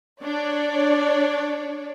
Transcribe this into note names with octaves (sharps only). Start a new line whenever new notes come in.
D4 C#5 D5